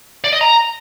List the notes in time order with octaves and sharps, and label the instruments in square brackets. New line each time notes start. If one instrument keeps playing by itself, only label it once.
[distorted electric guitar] D5
D#5
A#5